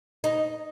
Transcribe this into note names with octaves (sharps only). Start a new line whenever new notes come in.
D#4